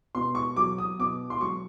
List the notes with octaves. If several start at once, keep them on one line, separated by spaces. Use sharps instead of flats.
B2 C6
C#6
F#3 D6
D#6
B2 D6
C6
F#3 C#6